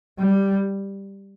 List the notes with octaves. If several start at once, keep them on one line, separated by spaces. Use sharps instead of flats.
G3